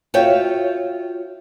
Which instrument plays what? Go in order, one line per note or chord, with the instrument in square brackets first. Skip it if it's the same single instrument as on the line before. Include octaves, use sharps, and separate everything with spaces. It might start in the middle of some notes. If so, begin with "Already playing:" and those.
[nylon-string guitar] F4 F#4 C#5 E5 G5